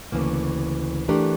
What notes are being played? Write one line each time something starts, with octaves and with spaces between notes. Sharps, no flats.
D2 C#3 E3 A#3
E3 A3 D4 G4 A#4